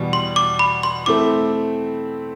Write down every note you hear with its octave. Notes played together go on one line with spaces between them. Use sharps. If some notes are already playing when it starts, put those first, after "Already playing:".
Already playing: E2 B2 G3 B3
C6
D6
B5
C6
A3 C4 E4 D6